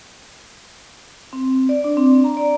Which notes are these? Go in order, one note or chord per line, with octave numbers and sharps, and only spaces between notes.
C4
D5
D4
C4
A#5
D5